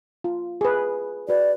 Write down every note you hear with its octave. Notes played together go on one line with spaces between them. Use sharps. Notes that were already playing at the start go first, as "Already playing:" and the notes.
F4
G#4 B4
F#4 B4 D5